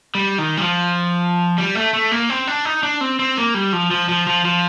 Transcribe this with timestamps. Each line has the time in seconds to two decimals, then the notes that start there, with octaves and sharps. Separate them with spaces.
0.15 G3
0.38 D#3
0.57 G3
0.61 F3
1.58 G3
1.75 A3
1.94 A3
2.11 A#3
2.30 C4
2.47 D4
2.65 D#4
2.83 D4
3.01 C4
3.19 C4
3.37 A#3
3.54 G3
3.73 F3
3.91 F3
4.09 F3
4.27 F3
4.45 F3